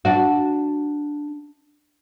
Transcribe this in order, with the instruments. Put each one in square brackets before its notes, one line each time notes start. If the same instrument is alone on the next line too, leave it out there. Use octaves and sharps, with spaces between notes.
[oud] D4 F#4